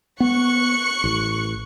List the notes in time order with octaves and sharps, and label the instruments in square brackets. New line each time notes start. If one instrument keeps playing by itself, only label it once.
[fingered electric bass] B3 [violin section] C#6 F#6 C#7
[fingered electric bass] A1